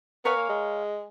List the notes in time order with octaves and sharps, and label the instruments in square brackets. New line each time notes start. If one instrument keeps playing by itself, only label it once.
[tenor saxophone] B3 [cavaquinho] A#4 C#5 F5 G#5
[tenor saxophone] A#3
G#3